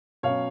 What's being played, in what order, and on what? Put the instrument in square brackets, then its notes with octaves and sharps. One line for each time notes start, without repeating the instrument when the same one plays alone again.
[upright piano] B2 F#3 C#4 C#5 F5